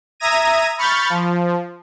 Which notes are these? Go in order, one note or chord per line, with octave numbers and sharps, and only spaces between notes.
E5 A#5 D#6 G#6 A#6 D#7
B5 C#6 F6 G6 A6
F3